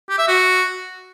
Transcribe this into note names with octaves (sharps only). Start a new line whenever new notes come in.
G4
E5
F#4